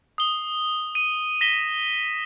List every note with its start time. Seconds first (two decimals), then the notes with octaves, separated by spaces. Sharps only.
0.18 D#6 G7
0.95 D#7
1.41 A#6 B6 E7 G7